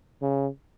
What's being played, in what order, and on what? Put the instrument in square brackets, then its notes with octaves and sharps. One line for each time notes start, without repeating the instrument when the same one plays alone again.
[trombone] C#3